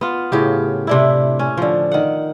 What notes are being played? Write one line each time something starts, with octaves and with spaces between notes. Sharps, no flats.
B3 F4
A2 C#3 G4
C3 D4 E4
C#4
D3 F3
D#3 F#5